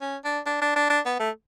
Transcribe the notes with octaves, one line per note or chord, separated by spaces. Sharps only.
C#4
D4
D4
D4
D4
D4
B3
A3